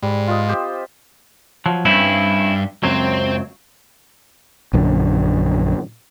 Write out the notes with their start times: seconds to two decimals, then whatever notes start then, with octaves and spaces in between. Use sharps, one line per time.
0.03 G#2 G3
0.28 F4 B4 D#5
0.49 C4 G4 C5
1.66 F3 F#3
1.85 G2 C4 C#4 E4
2.84 C#2 F#2 F#3 C4 C5
4.73 A#1 F#2 D3